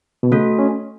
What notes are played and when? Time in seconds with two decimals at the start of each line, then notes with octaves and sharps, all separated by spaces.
0.23 B2
0.31 C#3 A3 F#4 A4
0.59 C#4